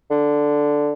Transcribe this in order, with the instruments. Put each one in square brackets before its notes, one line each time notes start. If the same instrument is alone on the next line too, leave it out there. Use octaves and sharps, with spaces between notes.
[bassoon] D3